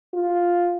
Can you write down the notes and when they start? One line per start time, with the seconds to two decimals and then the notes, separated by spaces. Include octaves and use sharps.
0.14 F4